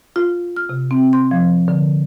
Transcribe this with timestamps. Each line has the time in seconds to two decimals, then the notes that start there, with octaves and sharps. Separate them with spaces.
0.16 F4
0.57 F6
0.69 C3
0.91 C4
1.13 C6
1.31 F3
1.68 D3